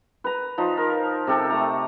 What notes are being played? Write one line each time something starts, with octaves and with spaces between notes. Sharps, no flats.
B4 A#5
F3 D#4
A#4
C3 G4 A4
A3 A#5